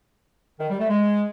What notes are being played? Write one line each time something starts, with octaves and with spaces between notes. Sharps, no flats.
D#3
G3
A3
G#3